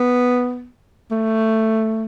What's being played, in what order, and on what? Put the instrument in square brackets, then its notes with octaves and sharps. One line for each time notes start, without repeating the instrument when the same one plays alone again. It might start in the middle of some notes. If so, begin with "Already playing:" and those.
Already playing: [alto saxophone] B3
A3